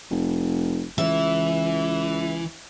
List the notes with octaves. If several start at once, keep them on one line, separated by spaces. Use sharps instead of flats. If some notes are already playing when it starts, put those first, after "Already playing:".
F1
C#2 E3 E5